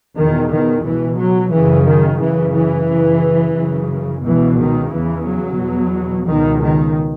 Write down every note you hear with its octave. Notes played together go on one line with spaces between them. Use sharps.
E2 B2 D#3
D#3
C#2 B2 E3
F#3
F#2 C#3 E3
D#3
F#2 C#3 E3
E3
F#2 C#3
F#2 C#3
C#2 B2 E3
D#3
E2 C#3 E3
F#3
E2 B2
C#2 B2 D#3
D#3